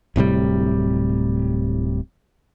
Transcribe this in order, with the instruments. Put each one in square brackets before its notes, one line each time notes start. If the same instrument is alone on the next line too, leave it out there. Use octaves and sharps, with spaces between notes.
[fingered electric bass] D1 A2 C3 G3